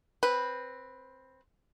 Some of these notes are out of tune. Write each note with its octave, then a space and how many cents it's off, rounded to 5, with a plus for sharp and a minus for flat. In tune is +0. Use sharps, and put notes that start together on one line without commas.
C4 +10 B4 -5